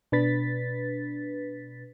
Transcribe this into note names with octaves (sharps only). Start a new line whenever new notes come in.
B2 D4 B4 A6 B6